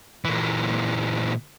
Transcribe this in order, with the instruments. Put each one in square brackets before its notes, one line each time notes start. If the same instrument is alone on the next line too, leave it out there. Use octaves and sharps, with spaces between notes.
[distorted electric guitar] A#2 E3